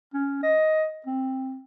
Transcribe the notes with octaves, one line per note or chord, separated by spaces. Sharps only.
C#4
D#5
C4